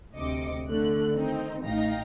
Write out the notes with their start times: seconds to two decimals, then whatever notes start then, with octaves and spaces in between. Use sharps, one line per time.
0.15 D2 C3 D#5 D6 C#7
0.69 D3 A3 F#6
1.15 D#3 C4 D#4
1.64 A1 A3 D#4 F5 G5 A#6